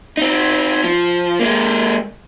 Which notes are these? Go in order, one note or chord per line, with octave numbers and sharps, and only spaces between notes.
C4 D#4
F3
G#3 A#3